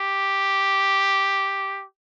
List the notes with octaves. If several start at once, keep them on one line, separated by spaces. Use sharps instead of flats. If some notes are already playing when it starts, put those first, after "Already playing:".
Already playing: G4